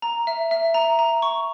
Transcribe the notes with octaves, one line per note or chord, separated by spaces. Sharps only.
A#5
E5
E5
A#5
A#5
C#6